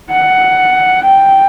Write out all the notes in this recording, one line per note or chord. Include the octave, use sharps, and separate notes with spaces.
F#5
G5